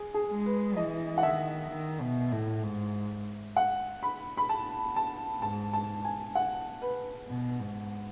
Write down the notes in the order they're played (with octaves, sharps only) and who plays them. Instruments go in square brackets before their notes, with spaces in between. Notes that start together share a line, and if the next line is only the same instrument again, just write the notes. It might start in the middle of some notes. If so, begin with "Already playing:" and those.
Already playing: [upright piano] G#4
G#4
[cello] G#3
[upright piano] B4
[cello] E3 [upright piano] D#5
[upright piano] F#5
[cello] D#3 [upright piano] E5
[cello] D#3
B2
A2
G#2
[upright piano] F#5
B5
B5
A5
A5
[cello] G#2 [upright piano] A5
[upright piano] A5
G#5
F#5
B4
[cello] B2
G#2